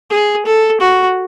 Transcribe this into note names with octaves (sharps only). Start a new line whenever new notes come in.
G#4
A4
F#4